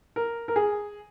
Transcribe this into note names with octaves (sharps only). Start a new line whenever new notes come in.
A#4
A#4
G#4